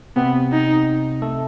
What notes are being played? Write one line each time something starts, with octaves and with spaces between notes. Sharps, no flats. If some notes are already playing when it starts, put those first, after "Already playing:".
C3 B3 C4
D#4
A3 A4